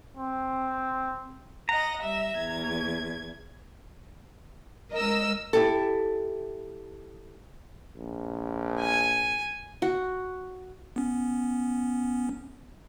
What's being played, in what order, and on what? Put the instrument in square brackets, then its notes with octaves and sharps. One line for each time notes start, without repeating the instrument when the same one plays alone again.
[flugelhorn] C4
[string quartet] D#5 F#5 [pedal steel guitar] A#5
[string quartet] G3 E5 E6
E2 G#6
[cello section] G#3 A#4 [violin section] D#5 E6
[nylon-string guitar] E4 G4 A4
[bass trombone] A#1
[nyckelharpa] G#5
[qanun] F#4
[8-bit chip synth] B3 C#4